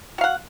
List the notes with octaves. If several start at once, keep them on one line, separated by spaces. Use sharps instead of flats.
F#4 F5 F#5